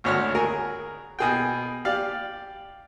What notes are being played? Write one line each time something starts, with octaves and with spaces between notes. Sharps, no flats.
G#1 D2 C#5 F#5 F6
G#4 A#4
B2 G#4 G5
G4 D5 F5